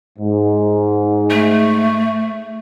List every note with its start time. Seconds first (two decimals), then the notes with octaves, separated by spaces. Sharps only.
0.19 G#2
1.30 A3